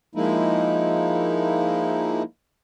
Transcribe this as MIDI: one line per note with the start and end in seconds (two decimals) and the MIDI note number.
0.15 2.22 53
0.15 2.22 56
0.15 2.22 58
0.15 2.22 63
0.15 2.22 64